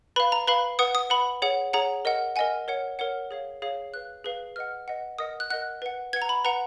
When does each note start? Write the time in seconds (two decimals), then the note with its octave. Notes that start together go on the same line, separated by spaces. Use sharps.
0.16 B4 F5 B5
0.32 A#5
0.47 B4 F5 B5
0.79 B4 F#5 D#6
0.95 D#6
1.10 B4 F#5 B5
1.42 G#4 C#5 F#5
1.73 G#4 C#5 F#5 A#5
2.05 A#4 D#5 F#5
2.36 A#4 D#5 F#5 G#5
2.68 A#4 C#5 F#5
2.99 A#4 C#5 F#5
3.31 G#4 C#5 F5
3.62 G#4 C#5 F5
3.94 G#4 B4 F5 F#6
4.25 G#4 B4 F5
4.56 B4 D#5 F#5 F6
4.88 B4 D#5 F#5
5.19 A#4 D#5 F#5 D#6
5.40 F#6
5.50 A#4 D#5 F#5 F#6
5.82 B4 F#5
6.13 B4 G#6
6.16 F#5
6.22 A#5
6.29 B5
6.44 B4 F#5 A#5